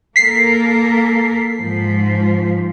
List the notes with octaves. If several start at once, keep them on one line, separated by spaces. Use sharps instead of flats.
A#3 A4 A#4 B6 C7
G#2 F3